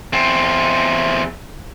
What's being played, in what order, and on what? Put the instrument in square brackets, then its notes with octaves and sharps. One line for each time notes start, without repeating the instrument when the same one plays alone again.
[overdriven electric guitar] E2 C4